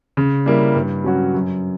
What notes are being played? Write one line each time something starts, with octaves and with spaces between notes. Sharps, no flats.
C#3
G3 A#3 E4
G2
F#3 C#4 F#4
F#2